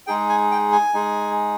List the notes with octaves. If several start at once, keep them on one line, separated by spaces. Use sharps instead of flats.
G#3 D#4 G#4 G5
G#5
G5
G#5
G#3 D#4 G#4